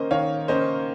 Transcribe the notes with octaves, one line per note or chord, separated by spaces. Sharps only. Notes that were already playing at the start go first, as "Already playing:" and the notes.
Already playing: D#3 A#3 C#4 C5 D#5
D#3 C#5 F5
A#3 C#4 C5 D#5